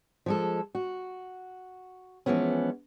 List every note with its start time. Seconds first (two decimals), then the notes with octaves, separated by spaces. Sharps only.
0.26 F3 G#3 A4
0.75 F#4
2.26 E3 F3 G#3 B3 C#4